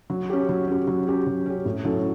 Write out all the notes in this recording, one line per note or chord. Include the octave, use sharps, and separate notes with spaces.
F#3
C#4 G4
F#3
C#4 G4
F#3
C#4 G4
F#3
C#4 G4
A2
F#3 C#4 E4 A4